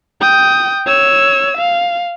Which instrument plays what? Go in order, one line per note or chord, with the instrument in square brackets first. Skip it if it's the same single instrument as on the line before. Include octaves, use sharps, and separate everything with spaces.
[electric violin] G5 D#6
C#5 E6
F5